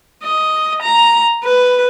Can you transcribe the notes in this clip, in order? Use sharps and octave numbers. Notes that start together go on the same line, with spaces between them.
D#5
A#5
B4